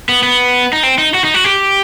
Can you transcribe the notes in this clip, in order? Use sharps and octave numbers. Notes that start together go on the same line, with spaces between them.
B3
B3
D#4
C4
D#4
F#4
D#4
F#4
G4